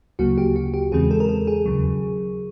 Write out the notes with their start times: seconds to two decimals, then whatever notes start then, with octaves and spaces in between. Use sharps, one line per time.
0.19 D2 C#3 F#3 A#3 F#4
0.38 G4
0.56 F#4
0.74 G4
0.92 E2 C#3 E3 G#3 C4 G#4
1.11 A4
1.20 A#4
1.29 A4
1.47 G#4
1.66 D#2 C#3 F#3